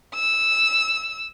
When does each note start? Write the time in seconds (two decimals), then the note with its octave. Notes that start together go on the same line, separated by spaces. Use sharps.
0.15 E6